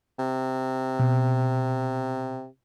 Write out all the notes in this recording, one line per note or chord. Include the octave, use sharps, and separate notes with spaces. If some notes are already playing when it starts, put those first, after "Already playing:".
C3
B2